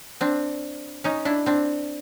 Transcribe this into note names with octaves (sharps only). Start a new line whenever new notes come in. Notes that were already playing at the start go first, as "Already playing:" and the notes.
C4 D4
C#4 D#4
D4 E4
C4 D4